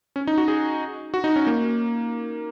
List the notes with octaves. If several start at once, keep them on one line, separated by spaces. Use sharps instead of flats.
C#4
D#4
F#4
G#4
F#4
D#4
C#4
A#3